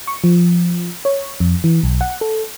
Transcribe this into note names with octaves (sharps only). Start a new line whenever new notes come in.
C#6
F3
C#5
F2
E3
B1
F#5
A4